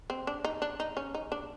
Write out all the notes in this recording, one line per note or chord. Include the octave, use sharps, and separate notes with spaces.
C4
D4
D#4
D4
D#4
C#4
D#4
D4